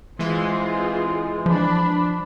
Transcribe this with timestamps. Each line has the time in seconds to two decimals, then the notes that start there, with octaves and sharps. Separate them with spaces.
0.19 E3 G#3 C4 F4 G#4
1.46 F3 D4 B5